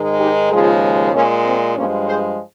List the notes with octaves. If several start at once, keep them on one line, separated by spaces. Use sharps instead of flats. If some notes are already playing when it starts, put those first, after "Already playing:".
Already playing: G#2 D#3 G#3
D#4 G4
D#2 C#3 F3 G#3 F4 G#4
A#2 G#3 A#3 C#4
C4
G2 F3 G#3 A#3 C#4
G#4 C5